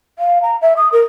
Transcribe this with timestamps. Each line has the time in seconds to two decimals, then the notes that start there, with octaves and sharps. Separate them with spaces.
0.19 F5
0.43 A#5
0.62 E5
0.77 D#6
0.92 A#4